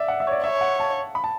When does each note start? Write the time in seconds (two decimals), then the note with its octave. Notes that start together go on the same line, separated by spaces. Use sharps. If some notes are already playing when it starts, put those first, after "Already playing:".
Already playing: D5 E5
0.08 F#5
0.20 E5
0.27 C#5
0.31 D5
0.44 C#5 E5
0.61 F#5
0.80 A5
1.15 B5
1.24 A5